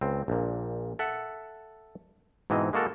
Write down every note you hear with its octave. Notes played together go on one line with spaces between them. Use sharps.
C#2 C4
A#1 A#2
A4 E5 F#5
G#2 B2 E3 C4 D#5
G#3 A#3 F#4 A4 A#4